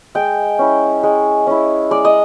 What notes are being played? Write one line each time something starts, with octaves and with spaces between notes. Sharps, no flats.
G#3 G5
C#4 E4
G#3
C#4 E4
G#3 D5
D#5